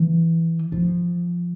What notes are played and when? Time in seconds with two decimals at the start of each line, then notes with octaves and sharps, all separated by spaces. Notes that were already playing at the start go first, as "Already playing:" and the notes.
Already playing: E3
0.72 F3